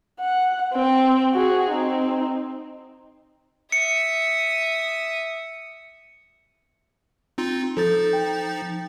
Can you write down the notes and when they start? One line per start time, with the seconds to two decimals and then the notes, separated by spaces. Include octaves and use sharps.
0.19 F#5
0.73 C4 G5
1.32 F#4 G#4
1.71 C4 D#4
3.72 E5 D#6 C#7
7.38 C4 D#4 F4
7.77 F3 D#4 A4 A6
8.13 G5